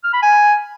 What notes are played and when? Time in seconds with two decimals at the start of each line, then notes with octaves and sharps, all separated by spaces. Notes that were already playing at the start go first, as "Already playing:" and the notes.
0.04 F6
0.13 B5
0.23 G#5